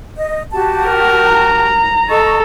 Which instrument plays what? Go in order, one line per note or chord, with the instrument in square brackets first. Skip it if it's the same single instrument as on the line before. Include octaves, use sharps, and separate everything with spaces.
[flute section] D#5
F#4 G4 A5
[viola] A#4
[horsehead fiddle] A#5
[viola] A4 [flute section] D#5 C#6